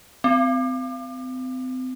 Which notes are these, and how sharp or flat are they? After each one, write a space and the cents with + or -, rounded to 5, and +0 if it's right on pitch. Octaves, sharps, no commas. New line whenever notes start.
C4 -35